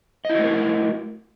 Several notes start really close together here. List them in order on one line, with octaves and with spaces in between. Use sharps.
D#5 E4 F#4 A3 A#4